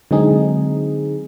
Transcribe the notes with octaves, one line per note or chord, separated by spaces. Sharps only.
D3 F#3 G#3 C4 D#4 G#4